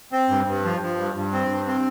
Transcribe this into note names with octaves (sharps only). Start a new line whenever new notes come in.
C4
G2
G2
F3
F3
G2
G2
C4
G2
C4